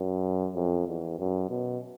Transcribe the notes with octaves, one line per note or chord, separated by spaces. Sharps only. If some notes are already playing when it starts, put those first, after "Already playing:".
Already playing: F#2
F2
E2
F#2
B2